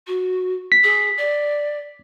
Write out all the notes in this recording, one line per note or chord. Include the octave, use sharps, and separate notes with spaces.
F#4
B6
G#4
D5